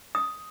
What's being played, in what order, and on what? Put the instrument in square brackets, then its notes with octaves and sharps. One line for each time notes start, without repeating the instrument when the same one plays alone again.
[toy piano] D#6